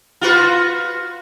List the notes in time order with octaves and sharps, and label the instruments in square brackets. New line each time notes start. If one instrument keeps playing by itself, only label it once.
[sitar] F4 F#4 B4